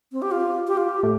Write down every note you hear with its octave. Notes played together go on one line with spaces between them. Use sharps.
C4
G4
F4
G4
F4
G4
A2